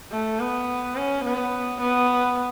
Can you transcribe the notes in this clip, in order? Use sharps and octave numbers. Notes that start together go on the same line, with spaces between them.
A3
B3
C#4
B3
B3